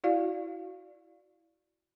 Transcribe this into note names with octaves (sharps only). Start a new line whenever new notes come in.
E4 F#4 D5 F5